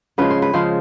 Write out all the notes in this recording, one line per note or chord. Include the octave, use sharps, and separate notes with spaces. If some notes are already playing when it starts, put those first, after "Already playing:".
C#3 F3 G#3 B4
C5
B4
C#3 F3 G#3 C5